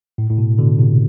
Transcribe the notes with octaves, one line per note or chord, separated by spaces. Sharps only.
A2
A2
B2
B2 D3
A2 C3